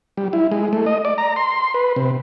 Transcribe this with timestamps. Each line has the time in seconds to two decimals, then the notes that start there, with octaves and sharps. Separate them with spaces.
0.17 G3
0.33 E4
0.51 G#3
0.73 A3
0.86 D#5
1.05 D5
1.18 A#5
1.36 C6
1.74 B4
1.96 C3